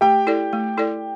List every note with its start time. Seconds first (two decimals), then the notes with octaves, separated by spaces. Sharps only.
0.01 A3 G4 G5
0.27 E4 A4 D5
0.53 A3
0.77 E4 A4 D5